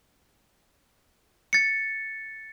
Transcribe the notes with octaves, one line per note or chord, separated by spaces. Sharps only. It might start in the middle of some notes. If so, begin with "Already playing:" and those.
A6 C#7